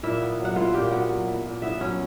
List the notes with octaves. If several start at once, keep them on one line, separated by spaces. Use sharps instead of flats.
A#2 E4 E5
B3
F#3
F#5
E4 F4 F5
A#2 G4 G5
B3 F#4 F#5 G5
F#3
E4
A#2
B3 E4 E5
F#3 C#4 C#5